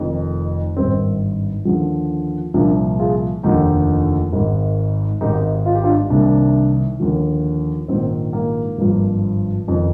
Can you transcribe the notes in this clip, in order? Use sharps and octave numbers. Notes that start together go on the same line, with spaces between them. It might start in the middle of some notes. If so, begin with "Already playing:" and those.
Already playing: F1 F2 D#3
G#1 G2 D#3 C4
D#2 D3 F3
C2 A#2 F3 A#3 D4
F4 G#4
F1 D#2 D3 F3 D#4 G4
G#1 G#2 D#3
G#1 G#2 D#3 D#4 G4
F4
G4
D4 F4
C2 C3 D#3 A#3 D4
D#2 D3 F3
A#1 G#2 D#3 C4
A#3
G#1 G2 F3
F1 F2 D#3